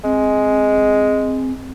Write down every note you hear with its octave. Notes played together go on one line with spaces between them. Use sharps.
G#3 C4